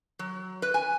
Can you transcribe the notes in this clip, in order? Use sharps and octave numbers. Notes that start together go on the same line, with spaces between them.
F#3
B4
G#5